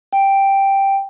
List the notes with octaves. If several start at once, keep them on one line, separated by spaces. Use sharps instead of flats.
G5